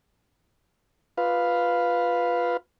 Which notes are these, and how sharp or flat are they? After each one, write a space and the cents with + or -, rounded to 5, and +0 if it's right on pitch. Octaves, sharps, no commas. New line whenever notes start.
F4 +0 B4 +0 F5 +0